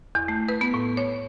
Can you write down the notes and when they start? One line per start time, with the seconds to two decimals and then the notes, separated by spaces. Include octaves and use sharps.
0.15 E2
0.28 A3
0.48 B4
0.61 B3
0.74 A2
0.97 C#5